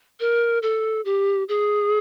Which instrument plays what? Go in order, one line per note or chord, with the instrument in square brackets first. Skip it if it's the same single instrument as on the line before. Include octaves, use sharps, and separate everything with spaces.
[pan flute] A#4
A4
G4
G#4